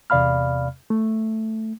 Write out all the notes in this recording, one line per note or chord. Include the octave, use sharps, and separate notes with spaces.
E2 C3 D5 F5 B5 F6
A3